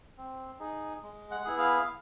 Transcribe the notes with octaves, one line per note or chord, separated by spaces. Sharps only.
C4
D#4 G#4
G#3
F#5
B3 E4 G#4
F5